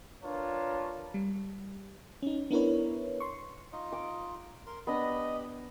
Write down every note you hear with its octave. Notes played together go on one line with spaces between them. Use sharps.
D4 F4 A#4 B4 C#5 A5
G3
C#4 D#4
B3 D4 E4 A#4 B4 C#5
C6 C#6
D#4 F4 D#5
D6
A#4 C6
B3 D4 G4 B4 D#5 B5